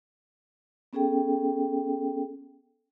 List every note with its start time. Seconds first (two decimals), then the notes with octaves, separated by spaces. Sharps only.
0.93 B3 C#4 G#4 A4 G5